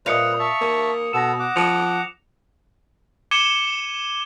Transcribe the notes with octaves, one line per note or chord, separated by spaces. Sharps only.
A#2 B4 C5 D#5 F5 D#6 C#7 F7
E5 A5 C#6
A#3
B2 B3 A4 A#6 E7
F#5 D6
F3 C#7 F7
D6 G#6 C#7 D#7 E7 G7